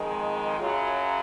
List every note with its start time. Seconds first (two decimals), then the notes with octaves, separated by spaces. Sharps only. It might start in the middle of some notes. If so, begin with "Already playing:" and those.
Already playing: F2 D#3 G#3
0.58 F#2 C#3 F#3 F4